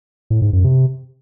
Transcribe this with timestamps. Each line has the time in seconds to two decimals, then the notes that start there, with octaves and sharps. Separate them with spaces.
0.30 A2
0.42 G#2
0.53 F#2
0.64 C3